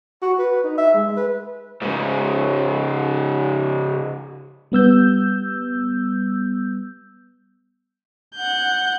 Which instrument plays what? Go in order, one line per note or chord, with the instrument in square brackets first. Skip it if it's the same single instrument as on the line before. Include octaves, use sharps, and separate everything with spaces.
[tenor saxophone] F#4
B4
D#4
E5
G#3
B4
[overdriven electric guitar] G#2 C#3
[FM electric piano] G3 B3 E6 G6
[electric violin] F#5 G6